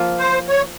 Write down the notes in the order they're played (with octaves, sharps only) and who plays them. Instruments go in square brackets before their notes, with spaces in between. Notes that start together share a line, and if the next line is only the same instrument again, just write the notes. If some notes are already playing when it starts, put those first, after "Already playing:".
Already playing: [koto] F3 A#3 F4
[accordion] C5
C#5